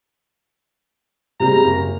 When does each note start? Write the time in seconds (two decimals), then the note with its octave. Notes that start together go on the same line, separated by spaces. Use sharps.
1.40 C3 G3 G#3 A#5
1.64 F#1